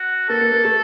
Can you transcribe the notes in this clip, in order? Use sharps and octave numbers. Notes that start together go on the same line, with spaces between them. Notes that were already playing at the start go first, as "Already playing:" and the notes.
Already playing: F#4
A#3 A4
A#3
A#3
A3